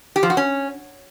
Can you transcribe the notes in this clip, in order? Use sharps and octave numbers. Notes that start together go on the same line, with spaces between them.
G4
F3
F#4
C#4